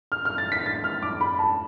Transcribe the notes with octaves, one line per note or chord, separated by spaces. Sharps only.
F6
F6
A6
B6
A6
F6
D6
B5
A5